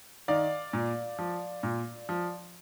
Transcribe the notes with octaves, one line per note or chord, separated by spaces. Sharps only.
D#3 D5 F5
A#2
F3
A#2
F3